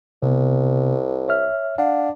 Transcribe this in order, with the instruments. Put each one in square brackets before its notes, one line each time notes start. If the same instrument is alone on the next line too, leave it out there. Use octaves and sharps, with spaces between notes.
[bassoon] C2 [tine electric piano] C3 B3
[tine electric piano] C#5 E5 F6
[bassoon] D4 [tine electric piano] F5 F#5